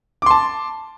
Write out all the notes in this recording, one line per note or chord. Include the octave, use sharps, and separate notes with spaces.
A5 C6 D6